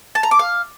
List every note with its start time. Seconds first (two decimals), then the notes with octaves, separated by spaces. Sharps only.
0.15 A5
0.23 A#5
0.31 D6
0.39 F5